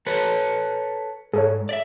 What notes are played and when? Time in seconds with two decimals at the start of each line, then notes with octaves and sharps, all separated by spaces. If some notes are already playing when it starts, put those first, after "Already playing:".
0.06 A4 B4 C#5
1.33 G#2 G#4 A4 C#5
1.69 D5 E5